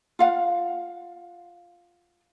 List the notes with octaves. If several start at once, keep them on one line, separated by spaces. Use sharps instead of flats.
F4 F5 F#5